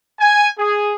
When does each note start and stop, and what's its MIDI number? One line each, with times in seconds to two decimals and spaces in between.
0.19 0.48 80
0.57 0.94 68